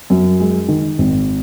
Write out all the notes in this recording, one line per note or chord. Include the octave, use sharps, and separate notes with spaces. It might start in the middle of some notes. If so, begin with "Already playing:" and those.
F#2
G#3
D#3
G#1